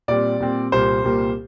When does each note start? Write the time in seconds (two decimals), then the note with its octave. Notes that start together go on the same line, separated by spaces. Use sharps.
0.08 A#2 G3 C4 D5
0.40 A#2 G3 C4
0.72 C2 A#2 G3 A#3 C5
1.04 C2 A#2 G3 A#3